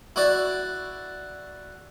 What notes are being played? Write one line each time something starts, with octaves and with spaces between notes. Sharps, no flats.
E4 F#4 D5